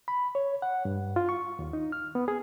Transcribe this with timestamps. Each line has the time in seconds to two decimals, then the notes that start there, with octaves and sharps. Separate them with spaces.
0.08 B5
0.35 C#5
0.62 F#5
0.85 G2
1.16 F4
1.29 C#6
1.59 D#2
1.73 D#4
1.92 F6
2.15 B3
2.28 G#4